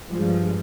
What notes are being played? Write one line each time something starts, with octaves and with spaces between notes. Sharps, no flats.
G2 F3 G#3